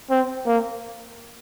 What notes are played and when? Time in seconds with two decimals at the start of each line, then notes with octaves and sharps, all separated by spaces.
0.11 C4
0.47 A#3